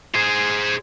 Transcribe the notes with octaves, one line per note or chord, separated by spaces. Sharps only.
G#4 C5